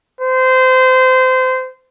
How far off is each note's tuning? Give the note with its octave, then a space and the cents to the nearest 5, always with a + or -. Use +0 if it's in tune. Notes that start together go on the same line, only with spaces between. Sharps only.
C5 -25